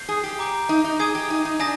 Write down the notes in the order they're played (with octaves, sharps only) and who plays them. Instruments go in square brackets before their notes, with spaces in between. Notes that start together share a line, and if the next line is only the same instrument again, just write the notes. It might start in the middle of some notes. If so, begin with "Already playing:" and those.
Already playing: [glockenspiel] G6 C7 G7
[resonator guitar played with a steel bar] G#4
G4
[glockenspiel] A#5 D6 G6 D7
[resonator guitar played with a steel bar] D#4
D#4
[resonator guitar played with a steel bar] G#4 [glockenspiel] D#6 G#6 D#7 G7
[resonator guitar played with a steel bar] G4
D#4
D#4
[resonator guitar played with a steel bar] D4 [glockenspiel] G#5 D#6 A#6